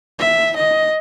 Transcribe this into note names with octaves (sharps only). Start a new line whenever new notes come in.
E5
D#5